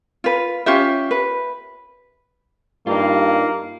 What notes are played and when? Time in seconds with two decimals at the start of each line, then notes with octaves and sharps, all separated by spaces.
0.24 F4 B4
0.66 C#4 F4 G4 E5
1.11 B4
2.87 G2 A#3 D#4 F4